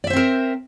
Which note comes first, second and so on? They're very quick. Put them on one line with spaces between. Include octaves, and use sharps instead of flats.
D5 E5 C5 C4 A#4